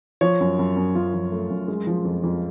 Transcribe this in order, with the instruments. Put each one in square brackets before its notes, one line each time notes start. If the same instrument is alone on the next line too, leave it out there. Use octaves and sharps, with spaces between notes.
[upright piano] F3 C#5
F#2
F#2
F#2
F#2 F4
F3
A3
F#2
G#3
F3
F2
F2